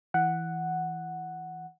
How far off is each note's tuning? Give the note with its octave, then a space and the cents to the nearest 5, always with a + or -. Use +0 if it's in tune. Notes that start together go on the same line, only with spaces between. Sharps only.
E3 +0 F#5 +0